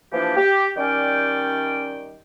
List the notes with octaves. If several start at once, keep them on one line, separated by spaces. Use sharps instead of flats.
E3 F3 A#3 D4 G4
G4
D#3 G3 C#4 D5 G5